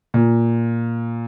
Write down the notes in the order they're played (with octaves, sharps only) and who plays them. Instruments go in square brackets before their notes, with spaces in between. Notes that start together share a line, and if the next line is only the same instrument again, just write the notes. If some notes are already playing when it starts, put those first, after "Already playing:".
[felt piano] A#2